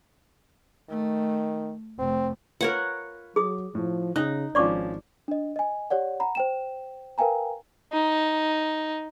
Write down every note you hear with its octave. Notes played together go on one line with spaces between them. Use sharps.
D#3 A3
F1 A3 C4
F4 A#4 B4 C#5 F#5
F#3 G#4 D#6
A2 F3
C#3 D#4 F#6
G#1 F3 C#4 D4 D5 C#6 D6
D4 D#5
D#5 G#5
G4 C#5 D5 F#5
F#5 A#5 B5
C5 G5 E7
A#4 B4 F5 G5 G#5 A#5
D#4